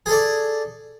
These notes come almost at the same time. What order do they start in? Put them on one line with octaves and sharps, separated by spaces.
G#4 A4 D5